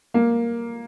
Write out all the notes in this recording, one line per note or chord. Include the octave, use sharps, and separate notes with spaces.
A#3